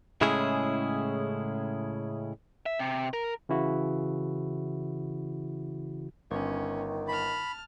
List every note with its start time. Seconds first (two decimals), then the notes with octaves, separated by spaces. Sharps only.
0.21 A2 C#3 G#3 C#4 E4 G#4
2.66 E5
2.79 C3
3.13 A#4
3.49 C#3 E3 E4 F#4
6.31 G1 D#3 C#4
7.08 A5 B5 F6